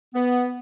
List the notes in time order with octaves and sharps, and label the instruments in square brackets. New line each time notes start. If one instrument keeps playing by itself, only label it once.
[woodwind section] B3